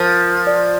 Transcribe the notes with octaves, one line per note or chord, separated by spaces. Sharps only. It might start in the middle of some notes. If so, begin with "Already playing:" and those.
Already playing: F3 A#4
D5